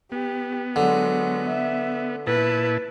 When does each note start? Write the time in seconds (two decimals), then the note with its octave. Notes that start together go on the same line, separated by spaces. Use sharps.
0.12 B3 G4
0.76 D3 F#3 G#3
1.47 E5
2.27 A#2 E4 B4 A5